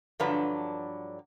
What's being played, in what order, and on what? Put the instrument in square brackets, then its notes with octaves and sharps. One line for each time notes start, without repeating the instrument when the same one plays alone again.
[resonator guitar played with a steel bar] G2 D3 F3 F#3 D4 B4